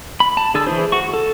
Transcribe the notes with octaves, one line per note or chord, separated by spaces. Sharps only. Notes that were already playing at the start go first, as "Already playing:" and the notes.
B5
A5
D3 G#4 A5 E6
E3 E4 G#4 C5
F#4 C#6
A4